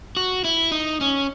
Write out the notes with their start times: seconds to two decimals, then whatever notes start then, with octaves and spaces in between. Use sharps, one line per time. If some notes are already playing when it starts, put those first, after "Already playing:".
0.17 F#4
0.44 E4
0.72 D#4
1.01 C#4